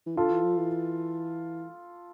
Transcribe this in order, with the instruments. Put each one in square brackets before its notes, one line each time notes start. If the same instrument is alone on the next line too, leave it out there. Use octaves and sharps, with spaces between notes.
[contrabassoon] E3
[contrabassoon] D3 [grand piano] F4 A4
[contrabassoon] E3
F3
E3